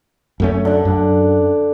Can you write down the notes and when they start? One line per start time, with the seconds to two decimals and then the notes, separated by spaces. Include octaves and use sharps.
0.40 F#2 A3 C#4
0.65 D3 E5 F#5
0.85 F#2